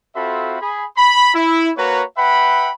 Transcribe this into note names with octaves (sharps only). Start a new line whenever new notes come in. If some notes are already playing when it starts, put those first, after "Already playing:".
C4 F4 F#4 A4 E5 B5
G#4 B5
B5
E4
A#3 F#4 B4 C#5 A#5
B4 E5 F#5 G5 B5